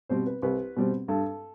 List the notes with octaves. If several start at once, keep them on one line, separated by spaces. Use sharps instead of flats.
B2 G3 C4 C5
B4
C2 B4
B2 G3 C4
G2 A4